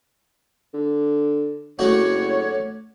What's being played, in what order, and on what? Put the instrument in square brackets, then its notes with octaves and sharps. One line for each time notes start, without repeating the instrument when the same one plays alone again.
[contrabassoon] D3
[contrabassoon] F#1 [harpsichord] A3 D4 F#4 [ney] C#5